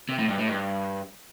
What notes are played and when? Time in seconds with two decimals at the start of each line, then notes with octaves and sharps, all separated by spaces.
0.09 C3
0.19 A2
0.29 G2
0.38 A2
0.48 G2